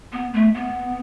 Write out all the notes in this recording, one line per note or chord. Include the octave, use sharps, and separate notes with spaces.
B3
A3
B3